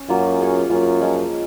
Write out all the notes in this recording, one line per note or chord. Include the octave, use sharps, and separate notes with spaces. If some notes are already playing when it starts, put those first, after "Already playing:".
Already playing: C#4
F#2 F#3 A#3 F4
C#4 G#4 C#5 F5
F#2 A#3 C#4 F4
F3 G#3 C#4